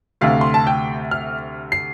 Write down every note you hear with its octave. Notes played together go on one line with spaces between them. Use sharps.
D2 C3 A3 F5
C6
A5
G5
F6
C7